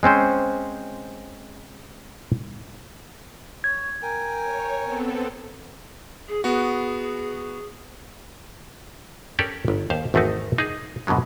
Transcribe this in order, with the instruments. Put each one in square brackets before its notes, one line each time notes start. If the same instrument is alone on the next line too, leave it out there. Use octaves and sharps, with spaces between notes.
[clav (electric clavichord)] G#3 C4 C#4 C5
[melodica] C#5 [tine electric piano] G#6
[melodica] A#4 G5 G#5
[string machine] C#5
B3 C4 A4
[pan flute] G#4
[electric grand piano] B3 F#4 [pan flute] G#4
[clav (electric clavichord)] C#4 G4 A4 A#4 D5
G1
D#2 C5 F5
G#1 E2 A3 C4 D#4 F#4
D#4 G#4
F#2 B2 D3 F#3 G#3